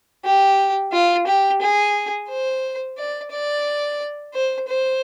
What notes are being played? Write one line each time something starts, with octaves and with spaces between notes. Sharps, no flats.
G4
F4
G4
G#4
C5
D5
D5
C5
C5